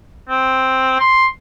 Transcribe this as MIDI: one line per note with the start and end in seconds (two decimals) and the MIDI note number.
0.28 0.97 60
1.00 1.26 84